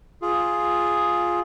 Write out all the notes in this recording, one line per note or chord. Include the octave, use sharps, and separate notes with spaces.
F4 G#4